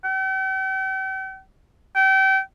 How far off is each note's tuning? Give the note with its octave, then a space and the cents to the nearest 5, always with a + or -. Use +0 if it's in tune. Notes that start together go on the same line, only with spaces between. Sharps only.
G5 -45
G5 -35